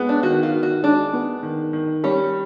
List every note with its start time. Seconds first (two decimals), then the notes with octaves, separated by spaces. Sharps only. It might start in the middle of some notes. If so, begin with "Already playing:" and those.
Already playing: G#3 B3
0.09 D4
0.23 D#3 F#4
0.43 F4
0.53 D#3
0.63 F#4
0.83 G#3 D4
1.13 B3
1.43 D#3
1.73 D#3
2.04 G3 C#4